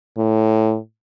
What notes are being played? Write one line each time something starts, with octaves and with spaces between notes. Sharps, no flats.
A2